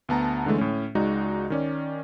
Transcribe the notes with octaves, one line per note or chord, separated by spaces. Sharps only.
D2 B3 A5 A#5
D3 E3 G#3 A3
A2 C#4
C#2 G#3 D#4 F#4 D5
D#3 C#4 D5